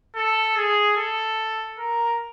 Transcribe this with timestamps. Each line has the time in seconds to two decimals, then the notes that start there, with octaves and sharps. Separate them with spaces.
0.16 A4
0.57 G#4
0.97 A4
1.79 A#4